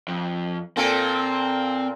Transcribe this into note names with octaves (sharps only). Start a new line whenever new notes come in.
F2
A#2 A#3 C4 A4